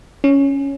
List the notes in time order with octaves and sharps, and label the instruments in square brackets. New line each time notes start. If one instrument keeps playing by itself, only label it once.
[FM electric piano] C#4